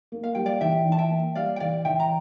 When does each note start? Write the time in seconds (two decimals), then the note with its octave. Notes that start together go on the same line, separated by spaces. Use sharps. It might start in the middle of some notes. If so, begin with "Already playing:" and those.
0.12 A#3
0.24 F5
0.35 G3 G5
0.46 D5 F5
0.61 E3 E5 G5
0.85 E3
0.92 A5
0.98 E5 G5
1.10 A#3
1.35 G3 D5 F5
1.56 G5
1.60 E3 D5 F5
1.85 E3 E5 G5
2.00 A#5